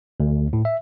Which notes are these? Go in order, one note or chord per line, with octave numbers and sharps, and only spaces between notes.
D2
A2
E5